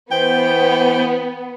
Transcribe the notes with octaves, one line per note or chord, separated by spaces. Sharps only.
E3 B3 C5 G5